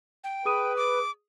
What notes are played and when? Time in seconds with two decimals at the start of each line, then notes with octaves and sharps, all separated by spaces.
0.24 G5
0.45 G#4 B4 D#6 D#7
0.77 D6